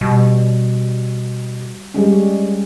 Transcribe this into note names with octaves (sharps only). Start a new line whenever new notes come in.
B2 G3
G3 G#3 C#4